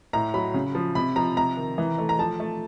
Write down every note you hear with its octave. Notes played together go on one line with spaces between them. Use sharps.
A2 A#5
F#3 B5
C#3
F3
C3 B5
F3 A#5
C3 A#5
D#3
E3
A3
A#5
F3 A5
A3